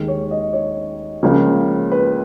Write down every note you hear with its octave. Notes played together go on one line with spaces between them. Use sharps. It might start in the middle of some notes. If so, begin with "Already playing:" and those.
Already playing: D#2 D#3 G#3
C#5
D#5
C#5
C#2 C#3 F3 A#3
B4